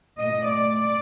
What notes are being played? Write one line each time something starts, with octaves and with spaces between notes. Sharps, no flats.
A#2 A3 D#5
D5